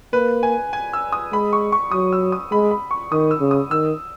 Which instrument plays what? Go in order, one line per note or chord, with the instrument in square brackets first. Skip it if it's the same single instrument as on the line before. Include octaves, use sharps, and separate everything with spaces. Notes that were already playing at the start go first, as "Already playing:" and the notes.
[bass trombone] A#3 [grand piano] B4
[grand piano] G#5
G#5
E6
D#6
[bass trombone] G#3 [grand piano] B5
[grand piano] C#6
C#6
[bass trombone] F#3 [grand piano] D#6
[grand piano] E6
D#6
[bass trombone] G#3 [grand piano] B5
[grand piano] B5
C#6
[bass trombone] D#3 [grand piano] D#6
[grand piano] E6
[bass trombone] C#3
[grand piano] D#6
[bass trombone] D#3 [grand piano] E6